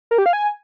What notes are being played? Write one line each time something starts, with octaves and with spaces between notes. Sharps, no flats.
A#4
G4
F5
G#5